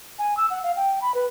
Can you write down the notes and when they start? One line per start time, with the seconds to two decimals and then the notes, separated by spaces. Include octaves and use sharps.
0.19 G#5
0.37 E6
0.50 F#5
0.64 F5
0.76 G5
1.02 B5
1.15 B4